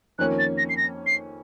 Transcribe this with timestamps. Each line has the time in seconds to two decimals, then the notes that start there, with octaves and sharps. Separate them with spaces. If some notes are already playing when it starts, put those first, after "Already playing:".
0.19 F2 D#3 A#3 C#4 F#6
0.39 A6
0.58 A#6
0.69 C7
0.77 A#6
1.07 C7